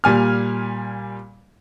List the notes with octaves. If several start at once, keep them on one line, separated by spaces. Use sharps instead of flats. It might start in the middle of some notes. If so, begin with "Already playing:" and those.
A#2 G3 G#5 F6